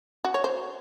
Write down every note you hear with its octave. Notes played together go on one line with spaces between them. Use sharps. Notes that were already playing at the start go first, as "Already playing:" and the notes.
F#4
C#5
C5